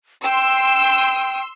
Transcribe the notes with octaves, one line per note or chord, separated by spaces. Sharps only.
G5 C6 E6